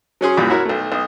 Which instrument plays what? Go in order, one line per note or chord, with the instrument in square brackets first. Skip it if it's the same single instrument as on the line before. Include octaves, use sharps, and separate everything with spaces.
[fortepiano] F#3 C#4 G#4 C6
C2 F#2 A#2 G3
E4 F#4 A#4 C#5
B1 A3
B1 D#5